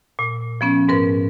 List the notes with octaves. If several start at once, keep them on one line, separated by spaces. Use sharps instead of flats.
A#2
F3 B3 C#4
G#2 A#4 B4